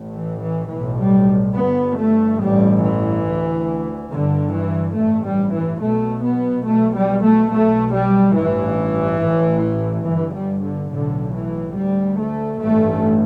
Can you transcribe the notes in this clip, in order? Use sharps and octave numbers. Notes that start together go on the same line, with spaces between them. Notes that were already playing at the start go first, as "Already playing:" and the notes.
Already playing: A1 A2
E3
E3
B1 A2 E3
G3
G1 G2 B3
A3
A1 G2 G3
E3
D2
G1 G2 D3
E3
A1 G2 A3
G3
E3
B1 B2 A3
B3
B1 B2 A3
G3
A3
B1 B2 A3
G3
A1 G2 E3
A1 A2
G1 G2 E3
G3
D3
B1 A2 D3
E3
D2 G3
A3
A1 G2 A3